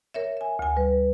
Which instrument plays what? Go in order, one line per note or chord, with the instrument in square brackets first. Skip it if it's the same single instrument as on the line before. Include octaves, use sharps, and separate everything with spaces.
[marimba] A#4 C#5 E5
E5 G#5
D2 G#5
[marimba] G3 [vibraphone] B4